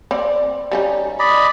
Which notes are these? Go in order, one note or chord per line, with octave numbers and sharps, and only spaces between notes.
C4 D5
G3 C#4 D#4
D5 D#5 B5